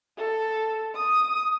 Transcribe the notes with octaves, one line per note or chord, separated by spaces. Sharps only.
A4
D#6